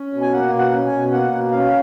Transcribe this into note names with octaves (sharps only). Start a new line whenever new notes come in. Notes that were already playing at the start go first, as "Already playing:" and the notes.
Already playing: C#4
B2
G#5
A#3 F#5
B2
F#5
C#4
G#5
B2
A#3 F#5
B2
C#4 F5